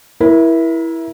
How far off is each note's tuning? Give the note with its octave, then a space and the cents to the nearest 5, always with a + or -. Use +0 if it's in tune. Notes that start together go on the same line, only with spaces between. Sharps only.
E4 +0 A#4 +35